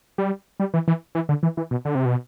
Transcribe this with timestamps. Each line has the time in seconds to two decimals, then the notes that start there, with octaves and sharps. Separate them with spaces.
0.18 G3
0.60 G3
0.74 E3
0.88 E3
1.15 E3
1.29 D3
1.43 E3
1.57 E3
1.71 B2
1.85 D3
1.95 C3
2.05 B2